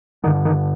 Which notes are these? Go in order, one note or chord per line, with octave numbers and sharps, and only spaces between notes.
G2 D3 D#3
D#3